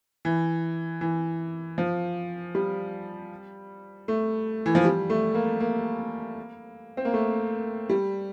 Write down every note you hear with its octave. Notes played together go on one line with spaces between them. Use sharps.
E3
E3
F3
G3
A3
E3
F3
G3
A3
A#3
A#3
C4
A#3
A3
G3